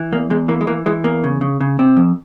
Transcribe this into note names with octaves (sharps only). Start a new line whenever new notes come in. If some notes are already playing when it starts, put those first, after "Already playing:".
Already playing: E3
E2 A#3
E2 G#3
E3 A#3
G#3
E3 A#3
E3 G#3
E2 A#3
C#3
C#3
C#3
C3 C4
F2